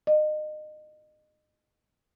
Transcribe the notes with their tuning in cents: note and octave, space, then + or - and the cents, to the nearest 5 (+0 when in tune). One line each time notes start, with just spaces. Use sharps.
D#5 -30